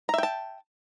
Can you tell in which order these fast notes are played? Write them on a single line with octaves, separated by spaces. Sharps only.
A#5 E5 G5 A5